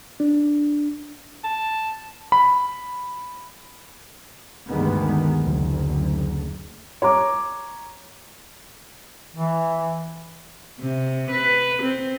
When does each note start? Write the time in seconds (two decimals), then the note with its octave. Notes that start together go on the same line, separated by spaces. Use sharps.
0.20 D4
1.44 A5
2.32 B5
4.68 D2 G2 D#3 G#3 B3
5.42 F#1 D2
7.02 C#5 A#5 D6
9.36 E3
10.80 C3
11.31 B4
11.83 C4